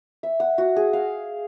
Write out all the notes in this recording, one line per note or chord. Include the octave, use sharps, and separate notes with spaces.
E5
F#5
F#4
G#4
F5